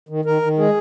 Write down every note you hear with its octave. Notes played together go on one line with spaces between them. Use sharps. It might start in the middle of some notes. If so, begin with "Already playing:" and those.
D#3
D#3 A#4
D#3
G#3 G#4